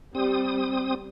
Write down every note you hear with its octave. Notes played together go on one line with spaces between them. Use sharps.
G3 C4 D#6